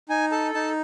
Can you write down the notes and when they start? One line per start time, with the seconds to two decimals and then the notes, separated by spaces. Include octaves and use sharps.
0.09 D#4 G#5
0.32 A4 A5
0.54 D#4 A5